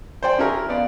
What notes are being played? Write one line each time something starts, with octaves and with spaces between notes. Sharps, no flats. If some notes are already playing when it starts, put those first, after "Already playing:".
C5 D5 G5
C#4 E4 G#4 A#4
B3 D5 F5